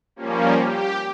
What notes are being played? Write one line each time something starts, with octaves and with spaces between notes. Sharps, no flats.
F3 G3 A#3 C#4
G4